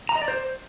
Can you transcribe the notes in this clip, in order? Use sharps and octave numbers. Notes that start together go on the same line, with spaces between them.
A#5
D#5
D5
C5